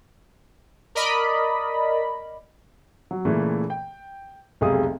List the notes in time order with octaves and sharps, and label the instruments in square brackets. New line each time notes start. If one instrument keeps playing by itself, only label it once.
[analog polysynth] A#4 D5 D#5 B5
[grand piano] F#3
A#2 C#3 E3 A3
G5
F1 B1 C3 G#3 F5 D#6